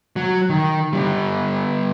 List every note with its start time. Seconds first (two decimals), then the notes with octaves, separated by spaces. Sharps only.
0.16 F#3
0.49 D#3
0.93 D3 G3